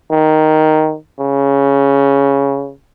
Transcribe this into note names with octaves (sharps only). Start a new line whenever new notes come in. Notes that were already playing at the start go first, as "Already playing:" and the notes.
D#3
C#3